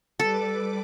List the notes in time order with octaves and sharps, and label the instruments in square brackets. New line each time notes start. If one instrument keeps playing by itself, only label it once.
[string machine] G3 B4 D6 [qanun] A4